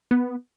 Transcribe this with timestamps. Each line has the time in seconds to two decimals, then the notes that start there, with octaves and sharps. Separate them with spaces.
0.11 B3